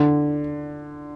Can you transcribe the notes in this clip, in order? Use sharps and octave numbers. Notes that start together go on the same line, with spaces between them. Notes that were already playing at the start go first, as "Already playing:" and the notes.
Already playing: D3